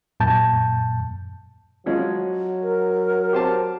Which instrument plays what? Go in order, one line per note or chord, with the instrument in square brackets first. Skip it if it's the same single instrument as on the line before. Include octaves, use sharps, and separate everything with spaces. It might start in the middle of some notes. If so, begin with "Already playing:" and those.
[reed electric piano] F#2 A#2 A5 G6
[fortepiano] F3 G#3 C#4 [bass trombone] F#3
[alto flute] A#4
[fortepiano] G4 C5 A5